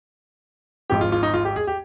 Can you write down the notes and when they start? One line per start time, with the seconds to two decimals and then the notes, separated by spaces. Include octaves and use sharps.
0.90 G#1 G#2 F3 G4
1.01 F4
1.12 F4
1.23 D#4
1.34 F4
1.45 G4
1.56 G#4
1.67 G4